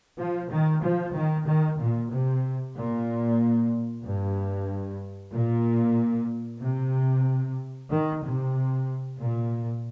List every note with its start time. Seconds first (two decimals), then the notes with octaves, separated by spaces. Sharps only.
0.18 F3
0.50 D#3
0.82 F3
1.14 D#3
1.46 D#3
1.79 A#2
2.11 C3
2.76 A#2
4.03 G2
5.33 A#2
6.61 C3
7.90 D#3
8.22 C3
9.19 A#2